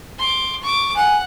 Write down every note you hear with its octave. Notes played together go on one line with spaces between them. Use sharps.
C6 D6
C#6 D6
F#5 G#5